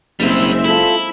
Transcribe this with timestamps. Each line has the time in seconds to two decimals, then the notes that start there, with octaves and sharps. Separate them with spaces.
0.20 F#1 G3 G#3 C4 E4 E5
0.64 E4 F4 A4